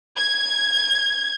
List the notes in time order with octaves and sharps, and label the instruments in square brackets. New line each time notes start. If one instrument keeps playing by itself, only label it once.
[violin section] G#6